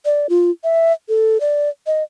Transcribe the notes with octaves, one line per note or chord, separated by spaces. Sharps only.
D5
F4
E5
A4
D5
D#5